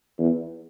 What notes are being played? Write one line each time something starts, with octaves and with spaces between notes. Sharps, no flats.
E2